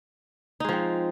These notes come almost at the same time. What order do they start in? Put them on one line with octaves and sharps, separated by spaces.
D#4 G#3 F3 C4